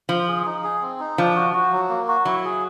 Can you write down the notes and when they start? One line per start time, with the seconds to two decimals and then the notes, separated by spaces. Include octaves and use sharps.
0.09 F3 C5
0.28 G#4
0.46 D#4
0.64 G#4
0.82 C4
1.00 D#4
1.18 F3 D4
1.36 F#4
1.53 F#4
1.72 F#3
1.89 A#3
2.08 F#4
2.25 F#3 E4
2.45 G#4